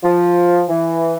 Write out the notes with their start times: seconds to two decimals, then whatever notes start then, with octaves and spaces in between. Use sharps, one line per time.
0.04 F3
0.69 E3